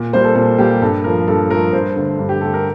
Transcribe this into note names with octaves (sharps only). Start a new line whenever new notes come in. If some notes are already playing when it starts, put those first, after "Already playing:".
Already playing: A#2
G3 A#3 C5
A4
A#2 A4
G3 A#3 G4
G2 A4
F3 A3 A#4
G2 A4
F3 A3 A#4
G2 C5
D3 A3
G2
G4
D3 A3 A4
A#4